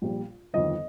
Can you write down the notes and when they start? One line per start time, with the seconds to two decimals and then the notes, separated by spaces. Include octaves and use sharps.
0.02 A#1 A#2 G3
0.54 G1 F2 D#3 D#5